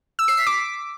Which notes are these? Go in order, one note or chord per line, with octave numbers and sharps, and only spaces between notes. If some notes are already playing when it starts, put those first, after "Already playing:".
E6
C7
B6
D6